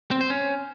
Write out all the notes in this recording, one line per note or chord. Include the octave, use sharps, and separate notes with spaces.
C4
C5
C#4